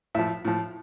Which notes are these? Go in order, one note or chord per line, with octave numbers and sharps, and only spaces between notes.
A2 F3 E5
A2 F3